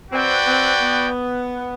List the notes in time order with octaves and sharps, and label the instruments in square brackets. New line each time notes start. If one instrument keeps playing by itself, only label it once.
[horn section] C4 [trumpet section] F#4 B4 D5 G5
[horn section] C4
B3